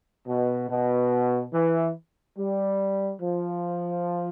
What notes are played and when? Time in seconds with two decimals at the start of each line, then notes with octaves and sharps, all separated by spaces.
0.27 B2
0.70 B2
1.53 E3
2.37 G3
3.21 F3